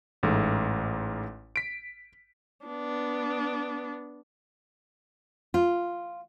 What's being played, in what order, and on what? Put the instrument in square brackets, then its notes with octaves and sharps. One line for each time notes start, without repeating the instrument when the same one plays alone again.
[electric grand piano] A1 G#2 A3
B6 D7
[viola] B3 D4
[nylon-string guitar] F4